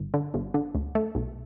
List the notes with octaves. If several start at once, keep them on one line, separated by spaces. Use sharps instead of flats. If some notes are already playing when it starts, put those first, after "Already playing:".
Already playing: G1
D3
G1
D3
D2
A3
B1